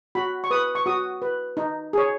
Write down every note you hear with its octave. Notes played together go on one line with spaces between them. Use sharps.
F#4 B5
C#6
B4 D#6
C#6
F#4 D#6
B4
D#4
G#4 C#5